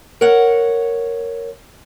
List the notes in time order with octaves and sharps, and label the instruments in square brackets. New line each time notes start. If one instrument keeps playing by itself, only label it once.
[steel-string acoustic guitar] A#4 C#5 F#5